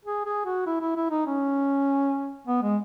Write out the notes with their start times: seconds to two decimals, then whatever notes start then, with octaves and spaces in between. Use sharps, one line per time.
0.05 G#4
0.25 G#4
0.45 F#4
0.66 E4
0.81 E4
0.96 E4
1.10 D#4
1.27 C#4
2.47 B3
2.63 G#3